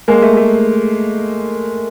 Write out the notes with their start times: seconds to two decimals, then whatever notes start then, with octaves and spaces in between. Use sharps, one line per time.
0.08 G#3 A#3
0.22 A3
0.37 A3